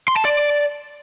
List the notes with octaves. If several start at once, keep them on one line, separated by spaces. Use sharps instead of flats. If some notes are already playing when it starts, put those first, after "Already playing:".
C6
A5
D5